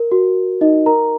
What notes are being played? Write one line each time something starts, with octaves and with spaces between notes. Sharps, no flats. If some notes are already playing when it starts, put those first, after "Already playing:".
Already playing: A#4
F#4
D#4 D#5
A#4 A#5